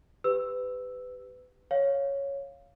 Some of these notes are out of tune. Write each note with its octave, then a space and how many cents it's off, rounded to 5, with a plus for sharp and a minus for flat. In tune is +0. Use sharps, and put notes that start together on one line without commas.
G4 +10 B4 +25 E6 +0
C#5 +0 F5 +0